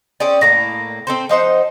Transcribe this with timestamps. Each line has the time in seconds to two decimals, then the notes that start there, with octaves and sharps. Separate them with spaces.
0.20 C4 C#4 G#4 D5
0.41 A2 A#3 A#5
1.07 C4 A4 C5
1.29 F3 D#4 C5 F#5